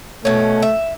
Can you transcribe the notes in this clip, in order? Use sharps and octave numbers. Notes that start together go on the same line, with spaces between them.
B2 A3 C#4
E5